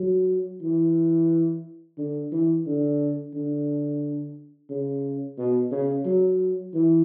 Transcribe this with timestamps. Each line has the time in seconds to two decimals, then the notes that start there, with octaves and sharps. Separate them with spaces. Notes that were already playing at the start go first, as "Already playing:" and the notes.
Already playing: F#3
0.62 E3
1.98 D3
2.32 E3
2.66 D3
3.34 D3
4.70 C#3
5.38 B2
5.72 C#3
6.06 F#3
6.74 E3